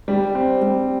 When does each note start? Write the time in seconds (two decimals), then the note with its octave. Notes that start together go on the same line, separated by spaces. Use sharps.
0.08 G3
0.35 C4
0.62 G3